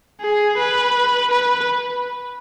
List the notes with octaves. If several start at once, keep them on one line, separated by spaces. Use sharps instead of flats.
G#4
B4
B4